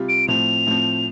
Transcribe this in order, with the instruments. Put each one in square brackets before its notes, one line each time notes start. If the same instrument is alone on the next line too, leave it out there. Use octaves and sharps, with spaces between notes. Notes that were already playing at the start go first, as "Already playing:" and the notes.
Already playing: [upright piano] C3 G3 F4
[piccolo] D7
[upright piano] A2 F3 C4 [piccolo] F7
[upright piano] A2 F3 C4